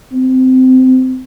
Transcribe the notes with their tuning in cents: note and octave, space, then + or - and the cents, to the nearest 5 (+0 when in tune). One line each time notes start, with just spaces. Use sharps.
C4 -20